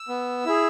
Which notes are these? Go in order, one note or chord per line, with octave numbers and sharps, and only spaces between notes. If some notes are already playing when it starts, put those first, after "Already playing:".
Already playing: E6
B3
E4 G#4